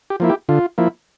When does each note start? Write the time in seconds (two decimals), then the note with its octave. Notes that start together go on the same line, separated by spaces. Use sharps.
0.10 G4
0.20 F3 A#3 E4
0.29 G4
0.49 D3 F4
0.78 F3 A#3 E4